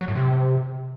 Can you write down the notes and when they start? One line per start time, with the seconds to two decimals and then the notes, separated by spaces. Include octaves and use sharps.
0.01 F#3
0.08 A2
0.15 C3